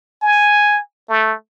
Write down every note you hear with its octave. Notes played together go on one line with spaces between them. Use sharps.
G#5
A3